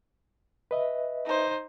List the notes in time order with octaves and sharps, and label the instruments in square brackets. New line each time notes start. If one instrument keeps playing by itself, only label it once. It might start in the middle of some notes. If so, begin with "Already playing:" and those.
[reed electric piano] B4 D#5 E5
[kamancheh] D#4 C5